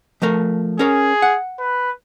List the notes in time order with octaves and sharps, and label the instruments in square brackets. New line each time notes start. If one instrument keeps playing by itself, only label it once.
[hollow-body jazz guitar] F3 A3 A#4
[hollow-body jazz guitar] C#4 A#4 C#5 [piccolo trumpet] G#4
[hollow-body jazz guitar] F#5
[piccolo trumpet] B4